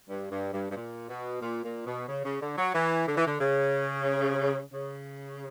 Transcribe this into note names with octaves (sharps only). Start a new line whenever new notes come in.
G2
G2
G2
G2
A#2
B2
A#2
A#2
B2
C#3
C#3
D3
F#3
E3
D3
E3
D3
C#3
C#3